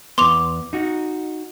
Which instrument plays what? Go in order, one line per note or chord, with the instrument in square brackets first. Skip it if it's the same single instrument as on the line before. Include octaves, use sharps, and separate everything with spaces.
[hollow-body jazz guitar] E2 B3 [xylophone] C6 D6 F7
[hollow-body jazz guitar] D#4 F#4